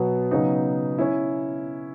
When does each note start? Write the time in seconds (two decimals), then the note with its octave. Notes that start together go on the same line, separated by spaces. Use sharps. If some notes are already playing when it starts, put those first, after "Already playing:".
Already playing: B2 F#3 B3
0.31 C#3 F#3 B3 D#4
0.98 C#4 E4